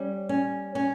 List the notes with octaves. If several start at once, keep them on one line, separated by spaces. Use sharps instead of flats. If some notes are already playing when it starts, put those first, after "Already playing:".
Already playing: G3 C#4
C#4
C#4